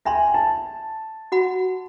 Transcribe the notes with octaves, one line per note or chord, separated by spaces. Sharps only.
E5 G5 G#5 B5 C6
A5
F#4 F#5 B5